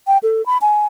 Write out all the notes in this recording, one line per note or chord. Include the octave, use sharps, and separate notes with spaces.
G5
A4
B5
G#5